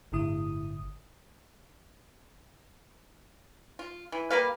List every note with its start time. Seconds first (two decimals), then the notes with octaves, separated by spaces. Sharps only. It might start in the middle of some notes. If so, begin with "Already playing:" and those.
0.12 G1 A2 D3 E4 D#6
3.79 F4
4.12 E3
4.30 G3 A#3 B4 F5